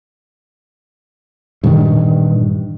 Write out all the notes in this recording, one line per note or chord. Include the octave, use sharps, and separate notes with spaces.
G2 A#2 D#3 E3